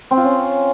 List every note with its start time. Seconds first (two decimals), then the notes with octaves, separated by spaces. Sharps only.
0.11 C4
0.17 F4
0.24 C#4